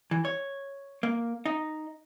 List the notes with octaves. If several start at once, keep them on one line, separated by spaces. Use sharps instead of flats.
E3
C#5
A#3
D#4